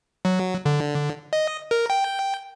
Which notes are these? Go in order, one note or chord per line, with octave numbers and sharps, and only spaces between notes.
F#3
D3
D#5
A#4
G5